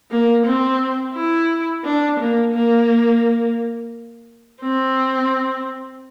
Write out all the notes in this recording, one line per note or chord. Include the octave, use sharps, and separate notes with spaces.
A#3
C4
E4
D4
A#3
A#3
C4